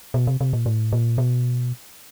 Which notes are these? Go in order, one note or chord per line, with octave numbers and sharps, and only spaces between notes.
B2
C3
C3
A#2
A2
A#2
B2